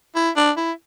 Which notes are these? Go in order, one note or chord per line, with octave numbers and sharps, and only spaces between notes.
E4
D4
E4